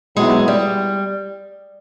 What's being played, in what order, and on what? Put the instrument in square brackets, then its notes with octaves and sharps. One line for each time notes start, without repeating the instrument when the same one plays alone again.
[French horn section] B2 F#3 B3 E4 G4 [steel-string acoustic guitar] G#3
[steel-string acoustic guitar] G3